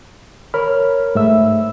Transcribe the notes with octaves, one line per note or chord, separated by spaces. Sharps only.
A#4 C#5 B5 F6
G#2 A3 E5 E6